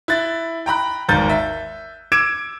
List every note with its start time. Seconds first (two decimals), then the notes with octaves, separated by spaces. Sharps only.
0.08 E4 F#6 A6
0.66 G5 A#5 B5 F#6
1.09 G#1 D#2 A#4 G6 A6 G7
1.29 E5
2.12 D6 E6 G#6 D7 E7